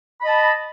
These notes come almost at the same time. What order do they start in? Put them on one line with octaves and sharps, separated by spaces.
B5 D#5 A5